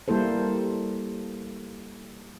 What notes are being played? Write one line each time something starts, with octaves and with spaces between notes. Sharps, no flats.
G3 A#3 E4 A4 C5